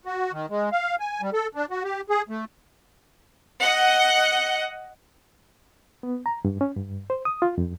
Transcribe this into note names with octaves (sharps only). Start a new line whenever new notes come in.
F#4
D#3
G#3
F5
G#5
G3
A4
D4
F#4
G4
G#4
A3
D#5 F#5
B3
A#5
G2
C#4
G2
C5
D#6
F4
F2